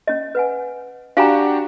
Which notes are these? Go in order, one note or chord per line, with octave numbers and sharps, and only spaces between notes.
C#4 D#5
B4 F#5 G#5
D4 F#4 G4 F5 G#5 A#5